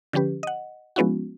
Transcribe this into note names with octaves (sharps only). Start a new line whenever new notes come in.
D3 F3 C#4 G4 B4
D#5 F#5
F3 G#3 B3 C#4 E4 F#4